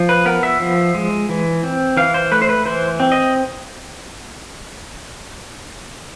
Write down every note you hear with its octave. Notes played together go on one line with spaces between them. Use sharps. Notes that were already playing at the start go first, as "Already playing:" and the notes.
Already playing: F3
B4
B3 A#4
E5
F3
G#3
E3
C4
E3 F5
C5
A3 B4
C5
B4
E3 C5
C4
D#5